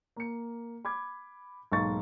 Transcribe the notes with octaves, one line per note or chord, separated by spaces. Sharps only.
A#3 C#7
B5 D6 G#6
B1 G#2 A#3 C#6 A6